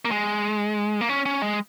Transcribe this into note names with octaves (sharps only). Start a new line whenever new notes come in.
A#3
G#3
A#3
C#4
C#4
G#3